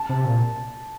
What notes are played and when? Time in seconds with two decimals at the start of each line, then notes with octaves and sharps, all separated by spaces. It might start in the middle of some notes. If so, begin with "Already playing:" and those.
Already playing: A5
0.09 C3
0.26 A#2